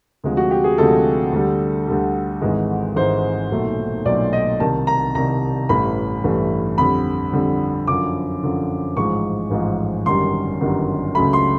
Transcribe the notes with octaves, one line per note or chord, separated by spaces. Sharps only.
D2 C3 F3 G#3
F#4
G4
G#4
D2 C3 F3 G#3 A4
D2 D3 G3
D2 D3 G3
G#1 G#2 E3 G#3
G#1 G#2 E3 G#3 C5
B1 A#2 F#3 A3
B1 A#2 F#3 A3 D5
D#5
C2 C3 D#3 A5
A#5
C2 C3 D#3 A#5
A1 G2 E3 A3 B5
A1 G2 E3 A3
F2 D3 G3 B5
F2 D3 G3
F#2 D3 F3 D6
F#2 D3 F3
A1 G#2 F3 G#3 C#6
A1 G#2 F3 G#3
G1 F#2 D#3 G3 C6
G1 F#2 D#3 G3
C#2 C#3 F#3 A3 B5
C6